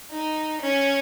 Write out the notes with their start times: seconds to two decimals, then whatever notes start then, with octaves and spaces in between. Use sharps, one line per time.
0.11 D#4
0.61 C#4